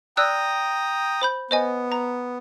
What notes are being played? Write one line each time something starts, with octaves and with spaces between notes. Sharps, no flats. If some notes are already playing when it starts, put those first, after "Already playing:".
D5 G5 A#5 D#6 E6 F#6
C5 B5 G6
B3 C5 D#5 G#5
A#5